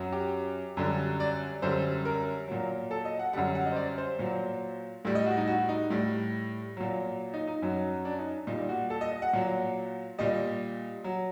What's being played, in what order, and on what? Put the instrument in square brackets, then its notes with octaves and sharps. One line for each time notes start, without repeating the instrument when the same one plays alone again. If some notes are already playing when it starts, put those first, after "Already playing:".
Already playing: [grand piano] F#2 F#3
G4
F#2 D3 G3
D5
F#2 D3 G3 C5
A#4
A#2 F#3
A4
D#5
F#5
F#2 D3 G3 F#5
F#5
D#5
C5
D5
C5
A#2 F#3
A2 G3
D#5
F#4
D#4
F#4
D#4
A2 G3
A#2 F#3
D#4
D#4
F#2 F#3
D4
D#4
A#2 G3 D#4
F#4
A4
D#5
D#5
F#5
A#2 F#3
A#2 G3 D#5
F#3